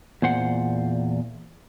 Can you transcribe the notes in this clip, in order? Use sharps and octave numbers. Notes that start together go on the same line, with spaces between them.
E2 A#2 C5 F#5